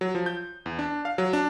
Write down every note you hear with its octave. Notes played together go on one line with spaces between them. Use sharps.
F#3
F3
G6
E2
D4
F5
F#3
D4